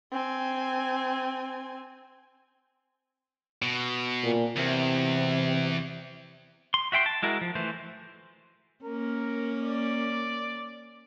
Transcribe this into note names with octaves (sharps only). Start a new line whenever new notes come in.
C4 G#5
B2
A#2
E2 C3
C6
F#4 E5 G5 C6
A5
G#3 E4 F#4 A#4
F3
E3 A3 C5
A#3 C#4 A#4
D5